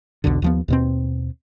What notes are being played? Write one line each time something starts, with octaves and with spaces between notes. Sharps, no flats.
B1 E2 B2 D3
D#2 F3 B3
D#2 B2 C4